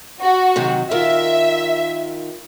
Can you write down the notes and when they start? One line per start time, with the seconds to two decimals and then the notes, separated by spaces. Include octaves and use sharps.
0.20 F#4
0.56 C3 D#3 F#3
0.91 D#3 F4 A#4 E5